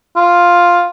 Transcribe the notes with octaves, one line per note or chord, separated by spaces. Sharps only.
F4